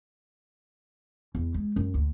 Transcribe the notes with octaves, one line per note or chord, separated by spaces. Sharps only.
E2
G#3
F#2
D2